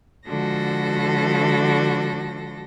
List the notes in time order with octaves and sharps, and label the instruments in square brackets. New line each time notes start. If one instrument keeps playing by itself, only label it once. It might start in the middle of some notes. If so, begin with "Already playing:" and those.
[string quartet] D3 F3 G#3 F#4 A4 A#6